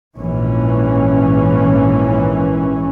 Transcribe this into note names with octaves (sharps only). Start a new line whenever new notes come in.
A#1 G#2 E3 C#4